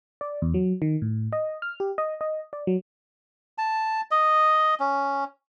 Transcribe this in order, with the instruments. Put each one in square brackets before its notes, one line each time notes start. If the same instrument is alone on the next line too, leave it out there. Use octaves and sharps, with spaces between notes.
[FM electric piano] D5
E2
F#3
D#3
A2
D#5
F6
G4
D#5
D#5
D5
F#3
[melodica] A5
D#5
C#4